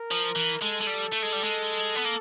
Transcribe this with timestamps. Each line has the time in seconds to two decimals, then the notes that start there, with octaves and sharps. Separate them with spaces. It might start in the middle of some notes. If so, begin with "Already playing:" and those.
Already playing: A#4
0.11 F3
0.36 E3
0.62 G#3 A4
0.82 G#3
0.87 G3
1.13 A3
1.23 G#3
1.33 G3
1.43 G#3
1.95 B3
2.05 A#3